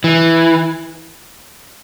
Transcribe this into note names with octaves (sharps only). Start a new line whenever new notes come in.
E3